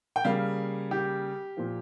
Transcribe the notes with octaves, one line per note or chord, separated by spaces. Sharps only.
G5
C#3 G3 A#3 F5
G4
A#2 F3 A#3